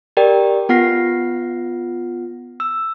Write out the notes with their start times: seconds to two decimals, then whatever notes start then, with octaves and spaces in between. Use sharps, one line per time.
0.17 G4 A#4 D5 G5
0.69 B3 F4 F#5 F6 A#6 C7
2.60 E6